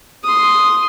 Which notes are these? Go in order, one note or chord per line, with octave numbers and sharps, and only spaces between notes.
C6 D#6